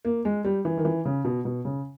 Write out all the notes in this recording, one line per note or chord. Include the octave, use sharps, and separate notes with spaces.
A#3
G#3
G3
E3
D#3
E3
C#3
B2
B2
C#3